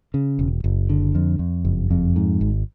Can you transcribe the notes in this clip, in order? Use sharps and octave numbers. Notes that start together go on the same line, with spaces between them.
C#3
E1
F#1
D3
F2
F2
F#1
F2
G#2
G#1